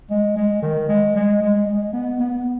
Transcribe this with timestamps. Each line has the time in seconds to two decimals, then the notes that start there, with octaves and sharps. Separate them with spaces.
0.10 G#3
0.36 G#3
0.62 D#3
0.89 G#3
1.15 G#3
1.42 G#3
1.66 G#3
1.93 B3
2.20 B3